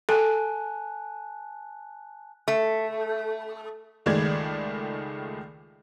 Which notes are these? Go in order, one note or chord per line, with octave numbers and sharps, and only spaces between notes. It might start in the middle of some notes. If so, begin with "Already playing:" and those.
A4 G#5 A5 F#6
A3
C#2 D#3 G#3 A3 D5 G#6